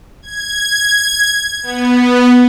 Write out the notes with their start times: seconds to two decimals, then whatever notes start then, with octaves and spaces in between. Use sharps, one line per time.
0.22 G#6
1.63 B3